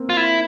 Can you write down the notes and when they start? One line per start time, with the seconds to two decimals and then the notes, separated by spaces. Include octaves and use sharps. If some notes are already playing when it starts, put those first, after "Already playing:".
Already playing: A#3 C4
0.10 F4
0.17 E4